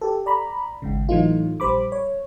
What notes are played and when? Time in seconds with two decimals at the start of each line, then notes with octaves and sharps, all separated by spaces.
0.01 G4 A4
0.26 D5 A#5 B5
0.82 G#1 G#2 C#3
1.09 A2 E3 F#3 A3 D#4 F4
1.60 A#1 G3 C5 B5 D6
1.92 C#5